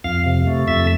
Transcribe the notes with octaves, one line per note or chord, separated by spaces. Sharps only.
F2 F5
C3
A3
F2 E5